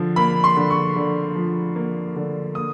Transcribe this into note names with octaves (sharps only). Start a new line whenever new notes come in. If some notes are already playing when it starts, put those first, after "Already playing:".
Already playing: D3 F3
A#3 B5
C6
D3
C#6
D3
F3
A#3
D3
A#3 D#6